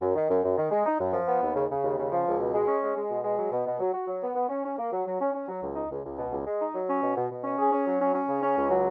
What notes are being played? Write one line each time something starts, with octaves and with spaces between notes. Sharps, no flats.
F#2
D#3
F#2
F#2
D#3
G#3
D#4
F#2
F3
B3
D#2
C#3
C#3
D#2
C#3
F3
C#2
B2
G#3
C#4
G#3
G#3
B2
G#3
F#3
B2
B2
F#3
F#4
F#3
B3
B3
C#4
C#4
A#3
F#3
F#3
C#4
C#4
F#3
C#2
D#4
C#2
C#2
B2
C#2
G#3
D#4
F#3
C#4
B2
B2
B2
C#4
G#4
C#4
F#3
C#4
C#4
C#3
C#4
C#2
F#3